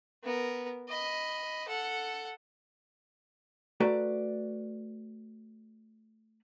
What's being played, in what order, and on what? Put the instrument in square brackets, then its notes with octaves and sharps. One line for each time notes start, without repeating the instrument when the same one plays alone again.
[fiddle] B3 A#4
D#5 B5
A4 F#5
[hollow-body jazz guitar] A3 F#4 A4 B4 D5 A#5